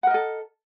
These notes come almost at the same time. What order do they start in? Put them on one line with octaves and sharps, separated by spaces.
F#5 A#4 D#5 A4